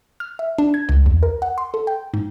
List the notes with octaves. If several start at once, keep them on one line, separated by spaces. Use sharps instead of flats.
F6
E5
D4
G#6
C#2
E2
A#4
F#5
C6
A4
G5
G#2